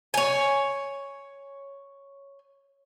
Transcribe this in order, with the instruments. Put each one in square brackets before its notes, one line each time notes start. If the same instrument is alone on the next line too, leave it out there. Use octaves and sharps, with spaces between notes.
[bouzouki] C#5 G#5